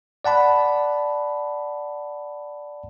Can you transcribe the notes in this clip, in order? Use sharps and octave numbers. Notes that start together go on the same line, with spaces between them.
D5 F#5 A5 B5